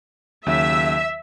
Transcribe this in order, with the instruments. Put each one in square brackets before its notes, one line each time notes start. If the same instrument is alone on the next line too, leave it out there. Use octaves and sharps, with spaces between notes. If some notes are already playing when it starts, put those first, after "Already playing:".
[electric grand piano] D#2 C#3 F#3 [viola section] E5